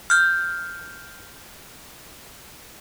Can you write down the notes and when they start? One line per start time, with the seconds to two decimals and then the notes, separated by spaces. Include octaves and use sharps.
0.10 F6 G6